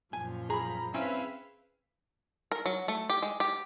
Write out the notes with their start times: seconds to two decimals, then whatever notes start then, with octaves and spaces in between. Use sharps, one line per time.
0.13 F#2 A#2 F3 G#5
0.50 G#4 A#5 B5
0.94 C4 C#4 E4 B4 F5 E6
2.52 A#4
2.66 F#3
2.88 A3
3.10 G4
3.22 G#3
3.40 G4